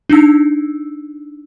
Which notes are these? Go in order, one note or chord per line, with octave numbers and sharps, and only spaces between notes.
D4 D#4 E6